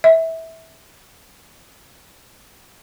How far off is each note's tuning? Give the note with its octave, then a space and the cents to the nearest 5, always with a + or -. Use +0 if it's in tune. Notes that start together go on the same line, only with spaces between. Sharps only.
E5 -20